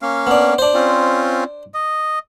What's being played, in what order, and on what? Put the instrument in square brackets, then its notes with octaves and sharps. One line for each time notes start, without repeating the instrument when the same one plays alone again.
[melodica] A#3 C#4 F5
[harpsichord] B3 D4
D4 C5
[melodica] C4 C#4 F4
D#5